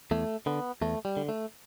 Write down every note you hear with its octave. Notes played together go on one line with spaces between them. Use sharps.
E2 A3
D3 B3
E2 A3
G3
D3
A3